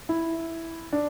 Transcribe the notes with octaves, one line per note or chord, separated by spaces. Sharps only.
E4
D4